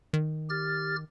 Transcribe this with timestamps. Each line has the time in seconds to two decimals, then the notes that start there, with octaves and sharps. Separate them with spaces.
0.13 D#3
0.49 G4 F6 A6